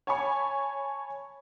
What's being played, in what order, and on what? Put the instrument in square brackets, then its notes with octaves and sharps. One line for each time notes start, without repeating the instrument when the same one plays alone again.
[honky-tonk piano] C#5 G#5 A5 B5 C#6